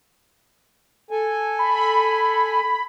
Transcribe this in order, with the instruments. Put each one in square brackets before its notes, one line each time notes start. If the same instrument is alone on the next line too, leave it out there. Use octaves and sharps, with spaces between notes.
[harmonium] A4 G#5
[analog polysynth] B5